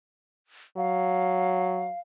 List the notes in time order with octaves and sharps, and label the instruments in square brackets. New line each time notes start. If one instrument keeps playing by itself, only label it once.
[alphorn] F#3 [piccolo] F5